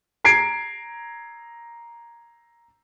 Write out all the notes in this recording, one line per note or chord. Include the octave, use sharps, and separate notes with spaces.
A#5 G#6 C7 D7